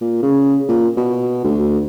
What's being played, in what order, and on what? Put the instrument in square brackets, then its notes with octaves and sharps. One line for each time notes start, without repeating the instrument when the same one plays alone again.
[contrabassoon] A#2
C#3
A#2
B2
D2